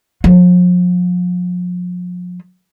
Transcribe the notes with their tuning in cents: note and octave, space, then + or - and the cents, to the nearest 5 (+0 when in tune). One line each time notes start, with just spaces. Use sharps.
F3 +40